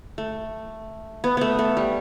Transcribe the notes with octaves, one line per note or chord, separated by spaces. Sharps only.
A3
B3
A3 B3
A3
G3